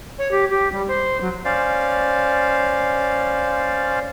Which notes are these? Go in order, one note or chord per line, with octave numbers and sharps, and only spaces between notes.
C#5
G4
G4
G3
C5
F#3
C#4 C5 D5 F5